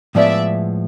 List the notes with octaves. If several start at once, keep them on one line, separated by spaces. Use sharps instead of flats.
A2 F3 G#3 B3 D5 E5